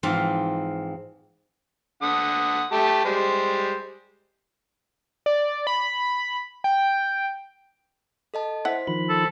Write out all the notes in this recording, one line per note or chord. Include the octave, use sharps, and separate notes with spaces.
G#2 E3 F3 C4 F4
D3 F#5 D#6
A3 G4 A5
G3 G#3 C5
D5
B5
G5
A4 D#5 A5
E4 C5 F#5 B6
D#3 F3 B5
A4